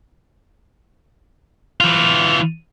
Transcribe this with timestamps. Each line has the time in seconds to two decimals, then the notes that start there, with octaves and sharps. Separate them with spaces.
1.80 E3 F4